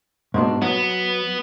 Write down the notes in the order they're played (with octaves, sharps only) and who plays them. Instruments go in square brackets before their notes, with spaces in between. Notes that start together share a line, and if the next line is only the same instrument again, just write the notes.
[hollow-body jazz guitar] G#2 B2 D4
[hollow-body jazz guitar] F#3 [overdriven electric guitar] B3